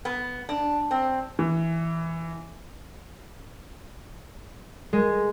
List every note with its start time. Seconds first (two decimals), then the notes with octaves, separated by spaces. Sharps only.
0.05 B3
0.49 D4
0.91 C4
1.39 E3
4.93 G#3